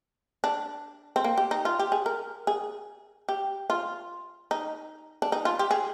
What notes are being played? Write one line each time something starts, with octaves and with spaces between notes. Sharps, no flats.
D4
C4
A#3
G4
D#4
F4
G4
G#4
A#4
G#4
G4
F4
D#4
D4
D#4
F4
G4
G#4